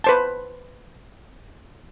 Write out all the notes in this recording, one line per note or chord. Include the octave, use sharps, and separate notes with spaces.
B4 C5 A5